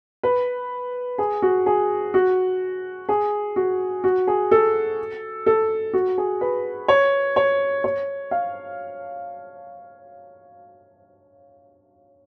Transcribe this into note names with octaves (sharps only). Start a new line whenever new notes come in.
B4
G#4
F#4
G#4
F#4
G#4
F#4
F#4
G#4
A4
A4
F#4
G#4
B4
C#5
C#5
C#5
F5